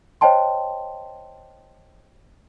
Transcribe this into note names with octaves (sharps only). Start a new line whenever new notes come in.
C5 C#5 D#5 G5 A5 C6